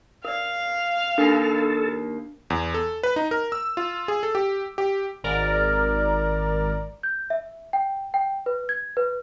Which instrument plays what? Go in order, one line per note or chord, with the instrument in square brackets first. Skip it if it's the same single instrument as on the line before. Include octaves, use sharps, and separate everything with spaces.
[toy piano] A#4 D5 [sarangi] F5
[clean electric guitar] D#3 A#3 [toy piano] D4 [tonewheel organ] A4
[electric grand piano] E2
A4
B4
D#4
A#4
E6
F4
G#4
A4
G4
G4
[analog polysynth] G#1 A#4 D5
[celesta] G6
E5
G5
G5
B4
G#6
B4